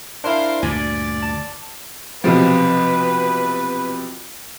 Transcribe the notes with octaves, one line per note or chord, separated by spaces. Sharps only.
D4 E4 A#4 C5 F5
D2 G2 A#2 D5 G#5
A5
B1 C3 F3 B4